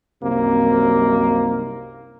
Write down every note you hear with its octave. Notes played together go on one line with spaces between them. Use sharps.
C2 F#2 C3 A#3 C4 D#4